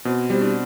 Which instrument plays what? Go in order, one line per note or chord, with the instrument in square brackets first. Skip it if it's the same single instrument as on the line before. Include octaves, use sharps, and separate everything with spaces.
[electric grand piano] B2 [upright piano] C4
[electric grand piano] G3 [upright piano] C4
[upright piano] D4